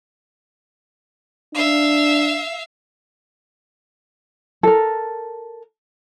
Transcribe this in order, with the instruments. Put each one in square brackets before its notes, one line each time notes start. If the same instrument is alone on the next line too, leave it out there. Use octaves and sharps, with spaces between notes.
[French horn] D4 [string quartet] E5 F5
[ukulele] A4 A#4